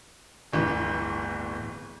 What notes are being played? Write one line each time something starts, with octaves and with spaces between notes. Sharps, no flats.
D1 G1 E3